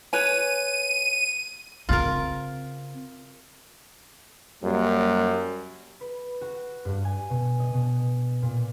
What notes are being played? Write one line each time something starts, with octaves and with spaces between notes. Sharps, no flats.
B4 C#5 G#5 D#7
C#3 C4 F4 A#4
F#2 G3 A#3
B4
F#4
G2
G#5
B2
D#5
B2
A#2